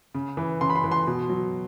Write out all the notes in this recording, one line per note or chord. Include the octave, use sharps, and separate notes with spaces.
C#3
E3
C#3 C6
B5
C6
E3
C6
B2
F#3